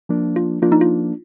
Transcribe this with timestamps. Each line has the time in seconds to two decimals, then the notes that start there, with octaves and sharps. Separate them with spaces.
0.09 F3 A#3 D4
0.36 F4
0.62 F3 A#3 D4 F4
0.72 D#4
0.81 F4